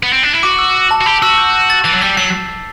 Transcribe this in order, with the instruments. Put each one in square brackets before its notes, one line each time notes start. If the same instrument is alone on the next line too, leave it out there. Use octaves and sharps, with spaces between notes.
[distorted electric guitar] B3
C4
D4
E4
[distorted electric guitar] F#4 [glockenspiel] D6
[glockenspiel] E6
A5
[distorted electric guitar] F#4
[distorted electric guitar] G4 [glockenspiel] B5
[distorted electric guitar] F#4 [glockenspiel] E6
[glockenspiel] G6
A6
[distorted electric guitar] E3 [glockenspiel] A6
[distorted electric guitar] F#3
[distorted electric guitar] G3 [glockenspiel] B6
[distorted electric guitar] F#3 [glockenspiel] C7